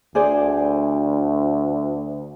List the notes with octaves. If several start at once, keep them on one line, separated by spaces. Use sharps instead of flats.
D2 G#4 C5 D5